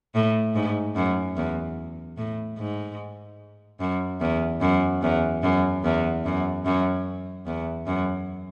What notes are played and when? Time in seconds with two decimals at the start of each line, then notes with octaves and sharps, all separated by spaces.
0.15 A2
0.55 G#2
0.96 F#2
1.37 E2
2.18 A2
2.58 G#2
3.80 F#2
4.21 E2
4.61 F#2
5.03 E2
5.43 F#2
5.84 E2
6.25 F#2
6.66 F#2
7.47 E2
7.87 F#2